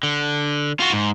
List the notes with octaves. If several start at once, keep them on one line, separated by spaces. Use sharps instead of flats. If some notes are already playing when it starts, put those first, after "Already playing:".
D3
F4 F#4
G#2